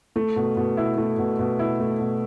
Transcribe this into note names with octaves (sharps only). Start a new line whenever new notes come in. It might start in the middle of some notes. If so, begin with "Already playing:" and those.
A3
B2
B2
E4
A3
B2
B2
E4
A3
B2